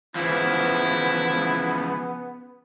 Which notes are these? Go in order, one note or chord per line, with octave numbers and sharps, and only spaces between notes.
C#3 E3 F3 B3 E4